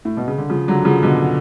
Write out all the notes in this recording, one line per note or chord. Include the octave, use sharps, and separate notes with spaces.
A2
B2
C#3
D3
C#3 F3
D3 F#3
C#3 F3
B2 D3